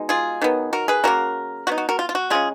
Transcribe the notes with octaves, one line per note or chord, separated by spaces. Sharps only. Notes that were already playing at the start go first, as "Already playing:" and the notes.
Already playing: B2 G#3 D#4
F4 G#4
D#3 F#3 B3
F#4 A#4
G#4 B4
C#3 F#3 A#3 F#4 A#4
F#3 B3 D#4 F#4
F#4
F#4 A#4
F4
F4
F#4
C#3 G#3 C#4 F4 G#4